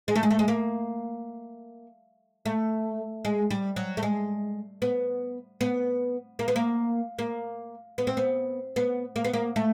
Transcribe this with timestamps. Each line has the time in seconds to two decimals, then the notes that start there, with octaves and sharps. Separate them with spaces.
0.08 G#3
0.15 A3
0.23 G#3
0.31 A3
0.39 G#3
0.48 A#3
2.46 A3
3.25 G#3
3.50 G3
3.76 F#3
3.97 A3
4.03 G#3
4.82 B3
5.61 B3
6.39 A#3
6.48 B3
6.56 A#3
7.19 A#3
7.98 B3
8.07 C4
8.17 B3
8.76 B3
9.16 A#3
9.24 B3
9.33 A#3
9.56 A3